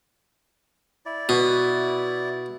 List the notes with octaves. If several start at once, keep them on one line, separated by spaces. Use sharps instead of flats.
E4 D5
B2 F#4 B4